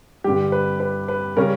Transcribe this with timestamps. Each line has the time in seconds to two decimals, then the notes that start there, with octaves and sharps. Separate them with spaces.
0.24 G2 D3 G3 G4
0.52 B4
0.80 B4
1.08 B4
1.36 C#3 G3 C#4 A#4